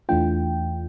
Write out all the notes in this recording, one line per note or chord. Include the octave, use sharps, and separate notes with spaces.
E2 E3 A3 D4 F4 G5